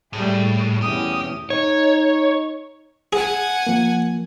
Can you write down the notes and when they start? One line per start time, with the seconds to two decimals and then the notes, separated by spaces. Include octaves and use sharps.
0.13 A2 G3 A3 G#4
0.82 E2 B2 C#4 G4 D#6
1.50 D#4 C#5
3.13 G#4 F#5 G#5
3.67 F3 A#3